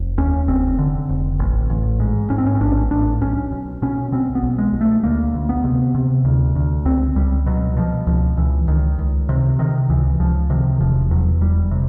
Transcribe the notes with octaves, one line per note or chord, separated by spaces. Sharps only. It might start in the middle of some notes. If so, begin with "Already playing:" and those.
Already playing: F1
D#2 C#4
F1 C4
D3
F1
A1
A1
G#2
G#2 C#4
C4
C#4
A1 D4
A1 D4
B1 C#4
B1
B2 C#4
B2 C4
B3
B1
G#3
B1
A3
D2 A#3
D2
B3
C3
C3
D2
D2
C#2 C4
C#2 G3
B2 F#3
B2 F3
C#2 F3
C#2 E3
C#2 D#3
C#2
C3
C3 D#3
C#2 E3
C#2 F3
C3 D#3
E1 F3
E2 F#3
E1 G3
C3